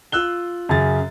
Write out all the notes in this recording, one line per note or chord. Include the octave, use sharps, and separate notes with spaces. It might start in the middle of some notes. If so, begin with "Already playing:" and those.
F4 E6 F#6 G7
F#2 C#3 A6